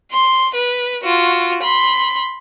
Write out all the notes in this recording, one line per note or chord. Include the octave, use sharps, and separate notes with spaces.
C6
B4
F4 F#4
B5 C6